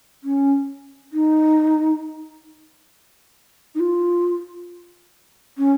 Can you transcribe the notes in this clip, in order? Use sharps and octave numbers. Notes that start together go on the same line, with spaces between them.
C#4
D#4
D#4
F4
C#4